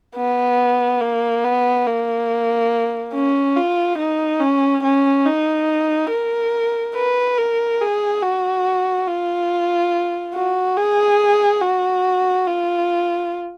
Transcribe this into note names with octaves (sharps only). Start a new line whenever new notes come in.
B3
A#3
B3
A#3
C#4
F4
D#4
C#4
C#4
D#4
A#4
B4
A#4
G#4
F#4
F4
F#4
G#4
F#4
F4